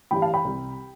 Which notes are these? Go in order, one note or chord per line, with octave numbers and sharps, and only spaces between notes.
A1 G2 E3 G3 G5 B5
F5 A5
G5 B5
C2 C3 G3